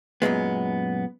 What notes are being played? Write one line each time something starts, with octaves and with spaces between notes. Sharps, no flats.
F#2 A#2 G#3 B3